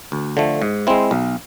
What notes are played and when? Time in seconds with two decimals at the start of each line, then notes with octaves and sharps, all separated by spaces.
0.12 D2
0.37 D3 F3 A3
0.62 G#2
0.87 G#3 C4 E4
1.11 B1